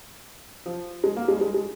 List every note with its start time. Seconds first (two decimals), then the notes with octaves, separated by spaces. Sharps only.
0.66 F3
1.04 G#3
1.16 A#3
1.28 G#3
1.36 G3
1.41 G#3
1.54 G#3